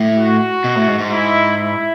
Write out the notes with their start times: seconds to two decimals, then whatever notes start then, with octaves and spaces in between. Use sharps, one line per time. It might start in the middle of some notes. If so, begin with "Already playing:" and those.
Already playing: A2
0.17 F#4
0.64 B2
0.76 A2
0.87 G#2
0.99 G#2
1.11 E4
1.58 E4